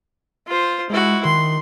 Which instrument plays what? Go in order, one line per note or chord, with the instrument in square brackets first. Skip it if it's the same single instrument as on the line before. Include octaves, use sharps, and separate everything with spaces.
[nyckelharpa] F4 C5
[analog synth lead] G#3 [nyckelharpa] E4 F#4
[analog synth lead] D#3 [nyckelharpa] C6